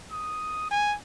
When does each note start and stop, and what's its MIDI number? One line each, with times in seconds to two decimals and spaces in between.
0.12 0.71 87
0.71 0.95 80